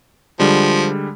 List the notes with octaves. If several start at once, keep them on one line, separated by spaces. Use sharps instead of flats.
D3 F3 G3 G#3